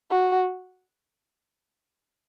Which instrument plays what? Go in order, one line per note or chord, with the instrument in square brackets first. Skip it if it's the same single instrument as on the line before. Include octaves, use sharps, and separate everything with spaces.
[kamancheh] F#4